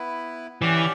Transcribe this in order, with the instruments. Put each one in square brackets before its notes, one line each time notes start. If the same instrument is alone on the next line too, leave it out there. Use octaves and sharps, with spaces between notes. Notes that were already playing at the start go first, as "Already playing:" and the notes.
Already playing: [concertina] B3 E4 B4
[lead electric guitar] E3 [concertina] C#4 G4 D5 F#5